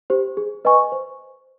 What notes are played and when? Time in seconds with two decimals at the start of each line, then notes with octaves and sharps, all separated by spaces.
0.10 G4 C5
0.37 G#4
0.65 B4 D#5 G#5 C#6
0.92 C5